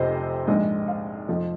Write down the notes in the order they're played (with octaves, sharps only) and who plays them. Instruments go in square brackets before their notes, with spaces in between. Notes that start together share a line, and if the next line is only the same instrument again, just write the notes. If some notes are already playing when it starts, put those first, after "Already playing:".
Already playing: [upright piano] F1 F2 C3 F3 C4 C5 D#5
A#1 G#2 G#3 D#5
F5
F1 F2 F3 D#5